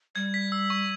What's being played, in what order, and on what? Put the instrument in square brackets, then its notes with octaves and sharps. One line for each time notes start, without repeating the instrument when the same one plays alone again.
[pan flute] G3 [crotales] G#6
[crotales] B6
E6
C#6